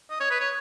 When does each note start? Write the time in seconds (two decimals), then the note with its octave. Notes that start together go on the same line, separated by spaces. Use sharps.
0.10 D#5
0.20 C#5
0.30 B4
0.40 C#5